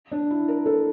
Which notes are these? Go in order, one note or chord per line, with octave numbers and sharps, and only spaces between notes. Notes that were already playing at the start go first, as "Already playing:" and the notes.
D4
E4
A#4
A4